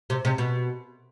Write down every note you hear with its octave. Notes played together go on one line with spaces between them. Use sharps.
C3
C3
B2